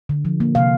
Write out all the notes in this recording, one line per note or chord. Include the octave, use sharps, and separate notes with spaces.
D3
F3
A#3
C3 F5